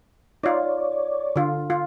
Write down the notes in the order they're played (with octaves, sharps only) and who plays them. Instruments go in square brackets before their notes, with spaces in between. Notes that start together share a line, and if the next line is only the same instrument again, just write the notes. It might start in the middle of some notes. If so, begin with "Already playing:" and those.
[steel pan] D#4 F4 [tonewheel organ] C#5 D5
[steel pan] D3 F4
F4